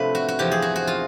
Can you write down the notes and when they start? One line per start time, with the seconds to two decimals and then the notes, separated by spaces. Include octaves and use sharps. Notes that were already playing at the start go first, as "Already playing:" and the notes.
Already playing: C3 F3 A3 D4 B4
0.15 F#4
0.28 F#4
0.39 E2 C3 F3 G4
0.52 G#4
0.62 F#4
0.76 F#4
0.87 F4